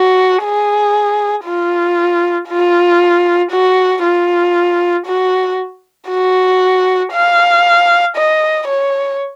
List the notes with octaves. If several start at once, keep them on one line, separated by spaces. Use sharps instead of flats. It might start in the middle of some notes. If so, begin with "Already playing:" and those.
Already playing: F#4
G#4
F4
F4
F#4
F4
F#4
F#4
F5
D#5
C#5